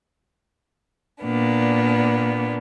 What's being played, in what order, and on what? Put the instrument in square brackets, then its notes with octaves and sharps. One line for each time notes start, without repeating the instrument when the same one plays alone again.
[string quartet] A#2 A#3 B3 D4